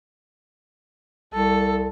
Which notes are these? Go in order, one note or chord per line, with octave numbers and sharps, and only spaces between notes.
C2 A4